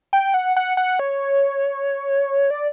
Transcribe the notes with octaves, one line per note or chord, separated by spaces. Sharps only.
G5
F#5
F#5
F#5
C#5
D5